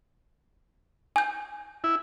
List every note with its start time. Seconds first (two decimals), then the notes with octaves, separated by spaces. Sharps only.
1.16 G#5 G6
1.84 E4